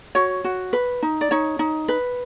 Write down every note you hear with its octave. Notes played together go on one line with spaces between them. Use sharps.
F#4 C#5
F#4
B4
D#4
D5
D#4 C#5
D#4
B4